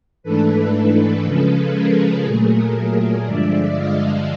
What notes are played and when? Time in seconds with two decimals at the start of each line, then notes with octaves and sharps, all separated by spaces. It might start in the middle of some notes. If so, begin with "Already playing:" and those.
0.23 G#2 E3 A3 D4 A4 B4
0.73 A4 B4
1.24 C#3 F3 G#3 C#4 A4 B4
1.74 G#4 A#4
2.24 A#2 F#3 A3 G#4 A#4
3.25 G2 D3 F3 G#3 D5 E5
3.75 D#5 F5